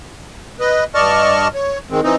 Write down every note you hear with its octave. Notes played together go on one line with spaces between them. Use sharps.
B4 D#5
G2 D5 D#5 A5 C#6 F6
C#5
D#3 G#3 C4
E3 C4 D#4